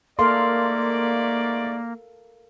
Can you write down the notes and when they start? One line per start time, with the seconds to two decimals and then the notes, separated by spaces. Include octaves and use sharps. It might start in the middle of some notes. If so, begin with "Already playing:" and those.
0.19 G#2 A3 A#3 A4 A#4 D5 F5 C6